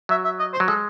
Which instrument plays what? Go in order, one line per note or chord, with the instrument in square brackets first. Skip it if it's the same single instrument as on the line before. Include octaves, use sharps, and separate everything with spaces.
[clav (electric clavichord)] F#3 [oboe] E5
[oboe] E5
D#5
C5
[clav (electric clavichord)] F#3
[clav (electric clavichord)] G#3 [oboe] A4